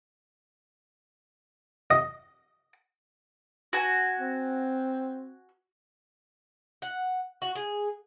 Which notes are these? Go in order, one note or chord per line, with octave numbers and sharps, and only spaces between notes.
D#5
F#4 G#5
C4
F#5
F#4
G#4